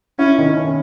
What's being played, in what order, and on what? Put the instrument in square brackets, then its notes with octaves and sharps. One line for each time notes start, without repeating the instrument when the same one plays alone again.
[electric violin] C#4 [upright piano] E4
[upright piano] D#3
C#4